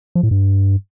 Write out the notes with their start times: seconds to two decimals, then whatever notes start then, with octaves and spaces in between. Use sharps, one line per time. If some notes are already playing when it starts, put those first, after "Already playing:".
0.15 F3
0.23 A2
0.31 G2